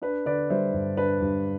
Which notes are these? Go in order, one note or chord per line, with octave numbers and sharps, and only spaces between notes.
D4 B4
D3 B4 D5
G3 C5 E5
G2
D4 B4
G2